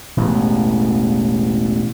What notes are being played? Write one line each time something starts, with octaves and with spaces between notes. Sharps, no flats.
E1 A1 E2